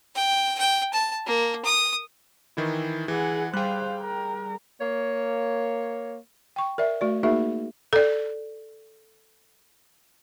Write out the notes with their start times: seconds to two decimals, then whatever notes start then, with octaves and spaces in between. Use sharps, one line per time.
0.15 G5
0.58 G5
0.93 A5
1.26 A#3
1.65 D#6
2.57 D#3 E3 E4
3.08 E3 G#4 F#5
3.54 G3 G#4 C5 F5 G5 F#6
4.01 A#4
4.80 A#3 C#5
6.56 G5 C#6
6.78 A#4 D5 E5
7.01 A3 F#4 D5
7.23 A#3 D#4 F#4 G#4 A#4 E5
7.93 A4 D5